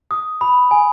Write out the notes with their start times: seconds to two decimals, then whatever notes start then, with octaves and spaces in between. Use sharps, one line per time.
0.11 D#6
0.41 B5
0.71 G#5